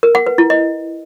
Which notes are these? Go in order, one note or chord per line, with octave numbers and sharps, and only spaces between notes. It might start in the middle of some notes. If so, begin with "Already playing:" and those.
A#4
F#5
B4
E4
D#5